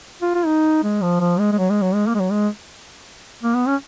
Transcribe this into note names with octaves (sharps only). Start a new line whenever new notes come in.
F4
F4
D#4
G#3
F3
F3
G#3
G#3
F#3
G#3
F#3
G#3
A#3
G#3
F#3
G#3
A#3
B3
C#4